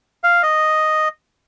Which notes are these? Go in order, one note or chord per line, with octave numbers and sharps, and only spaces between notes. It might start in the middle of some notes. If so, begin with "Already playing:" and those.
F5
D#5